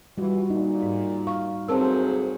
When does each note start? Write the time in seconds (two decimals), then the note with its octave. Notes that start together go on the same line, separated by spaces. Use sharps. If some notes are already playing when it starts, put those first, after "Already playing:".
0.18 E3 G3 F4 F#4
0.50 A#2 D#4
0.83 G#2
1.27 F5 C#6
1.68 D2 F#3 C4 G#4 A#4 C5 A5 E6